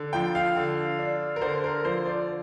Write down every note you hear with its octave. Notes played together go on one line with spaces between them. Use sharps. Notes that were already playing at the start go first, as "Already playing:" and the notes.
Already playing: D3
F3 G5
F5
D3
D4
A#4
D3 C5
A#4
F3 C5
D5